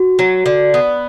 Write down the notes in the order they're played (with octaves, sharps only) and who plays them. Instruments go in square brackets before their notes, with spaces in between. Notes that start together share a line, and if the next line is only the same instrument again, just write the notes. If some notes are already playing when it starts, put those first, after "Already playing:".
Already playing: [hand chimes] F#4
[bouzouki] F#3
D3
B3